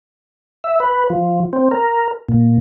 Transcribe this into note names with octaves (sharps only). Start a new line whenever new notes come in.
E5
B4
F3
C4
A#4
A#2